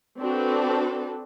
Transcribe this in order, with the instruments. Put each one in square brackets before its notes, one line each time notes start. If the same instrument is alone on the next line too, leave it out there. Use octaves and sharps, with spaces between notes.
[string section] C4 D4 F#4 A4 B4